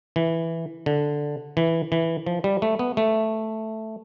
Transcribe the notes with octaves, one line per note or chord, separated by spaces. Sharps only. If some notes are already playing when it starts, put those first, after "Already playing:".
E3
D3
E3
E3
F3
G3
A3
B3
A3